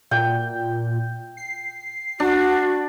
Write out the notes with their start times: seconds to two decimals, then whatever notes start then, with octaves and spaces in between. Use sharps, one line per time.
0.11 A#2 G5
1.37 C7
2.20 D4 F#4